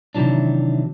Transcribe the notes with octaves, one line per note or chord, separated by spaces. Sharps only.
C3 D#3 E3 F#3 D4